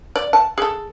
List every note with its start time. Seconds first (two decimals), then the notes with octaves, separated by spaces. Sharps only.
0.16 D5
0.33 A5
0.58 G#4 A4